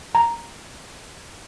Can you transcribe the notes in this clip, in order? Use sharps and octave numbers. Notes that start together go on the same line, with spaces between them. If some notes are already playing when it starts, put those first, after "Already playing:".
A#5